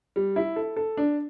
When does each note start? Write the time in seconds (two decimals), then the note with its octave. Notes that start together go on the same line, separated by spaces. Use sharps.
0.16 G3
0.36 E4
0.56 A4
0.76 A4
0.97 D4